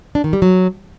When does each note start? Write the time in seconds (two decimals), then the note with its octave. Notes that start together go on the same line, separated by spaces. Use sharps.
0.15 D4
0.24 D#3
0.33 G3
0.42 F#3